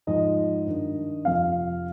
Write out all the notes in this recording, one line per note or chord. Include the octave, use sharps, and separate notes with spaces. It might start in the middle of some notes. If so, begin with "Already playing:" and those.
G#2 F3 D#5
G2 D#3
F2 C3 F3 F5